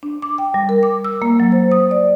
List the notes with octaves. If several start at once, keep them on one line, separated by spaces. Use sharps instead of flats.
D4
D6
G5
G3
A#4
D6
E6
A#3
F#3
C5
D#6
D5